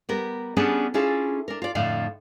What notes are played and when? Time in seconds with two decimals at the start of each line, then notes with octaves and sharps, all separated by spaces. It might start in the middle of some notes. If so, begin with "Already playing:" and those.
0.09 G3 B3 A#4
0.57 G3 B3 C#4 D4 G#4 A4
0.94 C#4 D4 E4 F4 G#4 A4
1.48 D4 A#4
1.62 F4 D5
1.75 F2 A2 D3 D5 F5